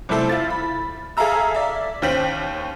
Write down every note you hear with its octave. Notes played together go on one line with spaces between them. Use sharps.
C3 G3 A3 E4 A4 C5
E4 F4 A6
B5
G#4 A4 E5 F5 A#5 E6
D5 E5
D#2 C#4 C5 G5 B6 F#7